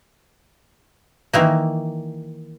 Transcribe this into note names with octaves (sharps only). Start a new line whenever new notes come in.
D#3 E3 A#3